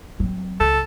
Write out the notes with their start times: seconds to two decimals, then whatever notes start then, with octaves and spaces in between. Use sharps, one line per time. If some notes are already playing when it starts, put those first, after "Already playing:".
0.20 F#3 C4
0.60 C#2 A4